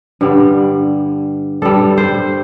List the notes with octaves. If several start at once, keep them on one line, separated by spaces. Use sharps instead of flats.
G2 D3 G3
G2 G3 A4
C5